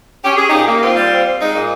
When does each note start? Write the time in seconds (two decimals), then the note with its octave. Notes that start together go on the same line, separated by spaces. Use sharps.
0.23 C#4 G4
0.36 C#4 G#4
0.48 A#2 D#4 G4
0.67 A#3
0.82 C4 F4
0.96 G3
1.11 C4
1.25 C4
1.39 G#3 D#4
1.54 A#2